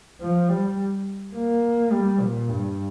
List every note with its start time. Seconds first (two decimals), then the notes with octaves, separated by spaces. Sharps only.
0.21 F3
0.49 G3
1.35 A#3
1.91 G3
2.20 A#2
2.48 G2